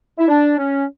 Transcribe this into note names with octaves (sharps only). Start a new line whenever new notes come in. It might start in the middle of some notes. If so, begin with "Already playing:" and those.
E4
D4
C#4